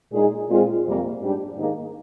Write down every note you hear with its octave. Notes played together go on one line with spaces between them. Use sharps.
A#2 G#3 D#4 G#4
A#2 G#3 C4 F4 G#4
F2 C3 G3 A#3
G#2 G3 D4 G4
G#2 D#3 A#3 D#4 G#4